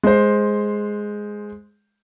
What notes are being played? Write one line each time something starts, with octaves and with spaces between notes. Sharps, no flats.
G#3 C5